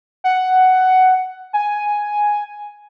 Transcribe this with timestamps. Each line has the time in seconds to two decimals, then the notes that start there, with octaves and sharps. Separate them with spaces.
0.24 F#5
1.53 G#5